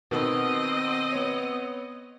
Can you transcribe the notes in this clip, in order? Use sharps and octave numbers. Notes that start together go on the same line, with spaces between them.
B2 D#3 B3 C4 D#5
B3 C#5